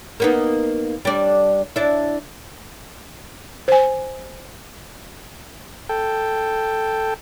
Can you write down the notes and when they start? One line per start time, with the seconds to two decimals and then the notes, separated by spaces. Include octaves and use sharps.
0.20 A#3 B3 D#4
1.05 G3 D4
1.76 D4 E4
3.68 C5 G#5
5.89 A4 G5